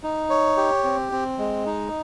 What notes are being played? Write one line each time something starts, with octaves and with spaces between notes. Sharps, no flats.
D#4
C#5
G4
C4
C4
G#3
D#4